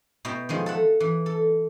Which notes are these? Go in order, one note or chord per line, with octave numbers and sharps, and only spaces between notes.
B2 E4 G5
D#3 F3 G#3
A4 E5 F#5
E3
A4